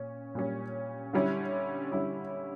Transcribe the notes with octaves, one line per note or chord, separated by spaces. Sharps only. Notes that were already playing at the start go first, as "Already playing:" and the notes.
Already playing: A#2 C#4
A#2 G3 C#4
D3 G3 C#4 E4
D3 G3 C#4 E4